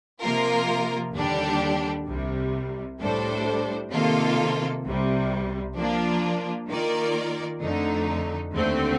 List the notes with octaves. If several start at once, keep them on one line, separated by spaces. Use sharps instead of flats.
C3 F3 A#3 F4 A#4
D#2 D3 G3 D4 G4
C2 C3 G3
A2 G3 D4 A4 C5
C3 D#3 A#3 F4 A4
C2 C3 G3
F3 A#3 D4 F4
D#3 A#3 F4 A#4 D5
F2 D3 A3 D#4
D#2 D3 A3 C4